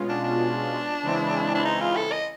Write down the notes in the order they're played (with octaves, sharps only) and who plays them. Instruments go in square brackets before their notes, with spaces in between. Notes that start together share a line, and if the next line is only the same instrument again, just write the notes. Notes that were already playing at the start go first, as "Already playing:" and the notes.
Already playing: [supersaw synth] B2 G#3 C#4 F4
[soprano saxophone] D4
D4
[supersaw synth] C#3 E3 G#3 C4 E4
[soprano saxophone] D4
D#4
F4
A4
D#5